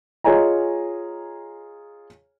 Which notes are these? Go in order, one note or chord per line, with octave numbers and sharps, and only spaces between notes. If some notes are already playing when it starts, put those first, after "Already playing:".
F4 G#4 C#5 D#5 G#5 A#5